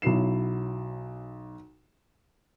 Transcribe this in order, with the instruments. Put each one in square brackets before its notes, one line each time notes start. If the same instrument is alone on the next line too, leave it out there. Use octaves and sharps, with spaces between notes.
[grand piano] B1 F#3 E4 C7 E7